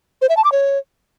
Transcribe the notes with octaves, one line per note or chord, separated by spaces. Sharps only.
C5
E5
A5
D6
C#5